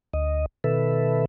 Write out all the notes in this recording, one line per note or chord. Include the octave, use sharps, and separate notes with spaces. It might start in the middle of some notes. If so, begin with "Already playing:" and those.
D2 D#5
B2 D#3 A4 B4 E5